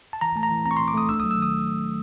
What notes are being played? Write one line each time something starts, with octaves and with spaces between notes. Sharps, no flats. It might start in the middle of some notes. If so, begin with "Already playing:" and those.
A5
E3 A#5
A3 A5
A#5
E3
C4 A#5
C#6
E3 C6
D6
A3 D#6
D4 E6
F#3 D#6
E6
D#3 D#6